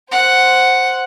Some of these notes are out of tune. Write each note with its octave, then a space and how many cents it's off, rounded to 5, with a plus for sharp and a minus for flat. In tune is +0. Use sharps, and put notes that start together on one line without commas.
C5 +0 F#5 +0